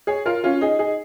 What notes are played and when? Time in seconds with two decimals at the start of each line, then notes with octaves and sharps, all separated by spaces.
0.07 G#4 C#5
0.26 F4 A#4
0.44 C#4 F4
0.61 D#4 G#4
0.79 D#4 G#4